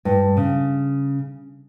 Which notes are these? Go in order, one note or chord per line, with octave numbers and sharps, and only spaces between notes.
G2
C#3